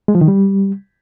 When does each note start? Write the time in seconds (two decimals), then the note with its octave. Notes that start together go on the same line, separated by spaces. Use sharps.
0.08 G#3
0.15 F3
0.21 D#3
0.28 G3